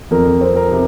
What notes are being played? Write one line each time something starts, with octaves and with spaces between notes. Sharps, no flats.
F2 A#4
C4
A#4
C3